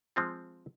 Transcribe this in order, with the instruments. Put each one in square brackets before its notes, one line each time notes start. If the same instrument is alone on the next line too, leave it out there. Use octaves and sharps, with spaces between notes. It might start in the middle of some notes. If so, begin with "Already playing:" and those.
[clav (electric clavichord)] F3 G#3 C4 F4